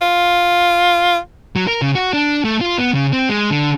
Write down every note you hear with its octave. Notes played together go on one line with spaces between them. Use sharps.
F4
F#3
A#4
C#3
F#4
D4
A3
F4
B3
C#3
C4
G#3
D3